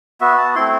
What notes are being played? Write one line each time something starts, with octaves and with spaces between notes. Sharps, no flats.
B3 F#4 E5
A5
A3 C4 E4 C6